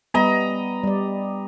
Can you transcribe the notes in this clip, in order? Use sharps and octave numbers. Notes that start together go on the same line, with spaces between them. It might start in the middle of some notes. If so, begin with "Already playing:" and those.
G3 B3 D#5 A#5 B5
G3 D5